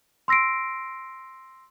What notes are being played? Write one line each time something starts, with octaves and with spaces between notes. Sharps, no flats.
C6 E6 A#6 C7 D7